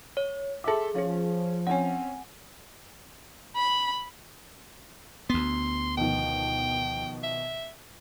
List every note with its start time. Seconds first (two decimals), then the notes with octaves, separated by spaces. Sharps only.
0.17 C#5
0.64 G#4 A4 E5 D6
0.95 F3 C#4 G#4 F5
1.67 C4 C#4 F#5 G#5
3.57 B5
5.30 D2 B3 C6
5.97 B2 D#3 F3 G5
7.23 E5